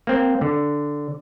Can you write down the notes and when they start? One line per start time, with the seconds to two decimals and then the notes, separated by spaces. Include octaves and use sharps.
0.07 A#3 C4
0.41 D3